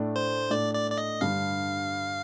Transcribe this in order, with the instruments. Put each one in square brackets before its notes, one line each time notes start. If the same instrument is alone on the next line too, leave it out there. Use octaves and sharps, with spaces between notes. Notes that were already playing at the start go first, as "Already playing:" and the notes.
Already playing: [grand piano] A2 A3 D4
[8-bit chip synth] C5
[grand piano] A2 A3 D4 [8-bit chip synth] D5
[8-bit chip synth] D5
D5
D#5
[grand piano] G2 D3 G3 [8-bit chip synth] F5